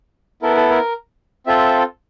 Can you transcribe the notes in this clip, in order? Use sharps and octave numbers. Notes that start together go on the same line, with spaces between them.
B3 E4 A4 A#4
A4
A#4
C4 F4 A4 E5